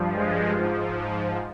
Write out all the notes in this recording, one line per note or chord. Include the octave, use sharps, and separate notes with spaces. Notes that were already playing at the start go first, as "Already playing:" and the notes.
Already playing: G2 F3
G#3
G#2 F3